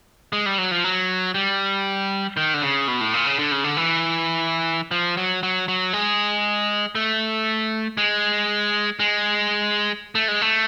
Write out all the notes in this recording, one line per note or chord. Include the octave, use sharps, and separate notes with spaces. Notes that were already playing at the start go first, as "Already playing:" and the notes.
G#3
G3
F#3
F3
F#3
G3
D#3
D3
C#3
B2
A2
A#2
C#3
D3
C#3
D3
E3
F3
F#3
F#3
F#3
G#3
A3
G#3
G#3
A3
G#3
A3